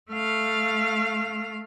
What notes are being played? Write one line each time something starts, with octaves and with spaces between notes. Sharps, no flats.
A3 F5